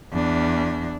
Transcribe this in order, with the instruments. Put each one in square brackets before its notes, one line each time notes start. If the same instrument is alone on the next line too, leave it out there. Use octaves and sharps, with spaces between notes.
[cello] E2 D4